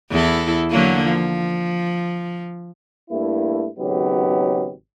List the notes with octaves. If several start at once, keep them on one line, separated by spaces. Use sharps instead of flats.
E2 E4 A4
D3 F#3 A#3
F3
G2 A3 A#3 E4
G#1 C#3 F#3 B3 D#4 G4